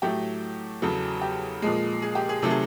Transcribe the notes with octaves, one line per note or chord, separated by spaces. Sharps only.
A2 F#3 A3 G4
E2 C#3 F#3 A4
G4
A#2 F3 G#3
G#4
G4
G#4
C3 D#3 F#3 A3 A4
G#4